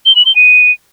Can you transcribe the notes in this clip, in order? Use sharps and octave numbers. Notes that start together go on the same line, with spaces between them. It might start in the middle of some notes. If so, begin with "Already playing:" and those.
G7
F#7
G7
D#7